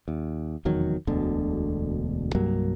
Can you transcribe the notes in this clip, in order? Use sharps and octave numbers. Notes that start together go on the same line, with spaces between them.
D#2
F1 E2 D#3 F#3
E1 D2 B2 D3
C2 G2 F#3 A#3